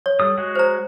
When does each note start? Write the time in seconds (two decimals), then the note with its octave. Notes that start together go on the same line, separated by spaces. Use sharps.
0.06 C#5
0.20 G3 A4 D#6
0.38 G#3 F#4 G#4
0.55 C5 A#5